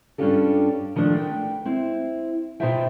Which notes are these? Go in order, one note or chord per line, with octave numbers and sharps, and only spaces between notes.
G2 C#4 D4 F4 G4 A4
D#3 F3 A3 D4
B3 G5
C4 E4
B2 D#4 F4 C5 E5 G5